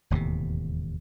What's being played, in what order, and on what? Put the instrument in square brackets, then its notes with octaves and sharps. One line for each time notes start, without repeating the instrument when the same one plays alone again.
[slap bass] E1 D#2 A2 C3